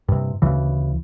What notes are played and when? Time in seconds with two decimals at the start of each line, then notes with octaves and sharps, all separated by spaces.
0.08 G2 C3
0.42 D2 C#3 E3